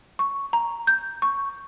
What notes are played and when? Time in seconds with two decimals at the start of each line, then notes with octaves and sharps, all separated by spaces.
0.19 C#6
0.53 A#5
0.87 G6
1.22 C#6